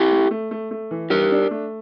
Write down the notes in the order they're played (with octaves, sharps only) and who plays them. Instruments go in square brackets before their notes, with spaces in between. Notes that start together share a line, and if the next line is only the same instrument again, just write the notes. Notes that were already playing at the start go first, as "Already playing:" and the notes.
Already playing: [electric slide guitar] E4 G4
[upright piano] A3
A3
A3
A3
E3
[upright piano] G2 [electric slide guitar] G4 A#4
[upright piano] D4
A3